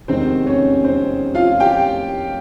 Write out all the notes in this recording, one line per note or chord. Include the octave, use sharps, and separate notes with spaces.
F1 E2 C3 D#3 G#3 C4 C5
C#4 C#5
C4 C5
F4 F5
G4 G5